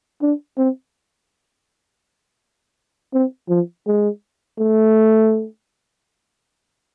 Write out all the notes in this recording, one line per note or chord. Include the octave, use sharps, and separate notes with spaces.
D4
C4
C4
F3
G#3
A3